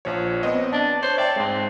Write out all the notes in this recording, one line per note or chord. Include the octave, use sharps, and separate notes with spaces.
A#1 F3 C#5
B3 C4 D#5
D4 A5
C5 C#5
D5 E5 G5 A5
G#2 G#3 C4